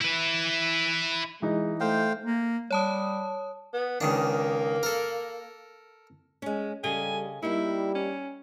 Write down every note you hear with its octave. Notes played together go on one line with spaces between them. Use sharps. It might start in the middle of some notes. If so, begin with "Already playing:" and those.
E4 B4
E3 G#3 D#4
A3 C5 F5 G5
A#3
G3 C#5 A5 D#6
B3
C#2 D#3 A#3 D4
A4 A#4
G#3 C#4
C#3 G3 G4 A4 D#5 G#5
G3 A#3 D#4 E4 G4
C#4